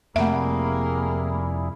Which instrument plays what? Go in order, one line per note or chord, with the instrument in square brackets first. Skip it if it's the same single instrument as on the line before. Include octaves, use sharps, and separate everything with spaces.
[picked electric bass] F2 C3 [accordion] G3 E4 G#4 [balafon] A3 E5 [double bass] A#3